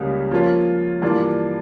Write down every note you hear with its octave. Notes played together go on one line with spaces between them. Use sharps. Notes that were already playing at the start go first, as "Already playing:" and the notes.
Already playing: C#2 C#3 G3 A#3 C#4
F3 A#3 C#4 F4
G2 E3 A#3 D4 F4